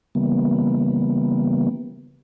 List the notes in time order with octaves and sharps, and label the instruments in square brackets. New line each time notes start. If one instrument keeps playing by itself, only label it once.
[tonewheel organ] C#3 E3 G3 A#3 B3